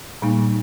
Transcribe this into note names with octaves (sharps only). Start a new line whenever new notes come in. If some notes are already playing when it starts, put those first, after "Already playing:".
A#2 G3 A#3 D#4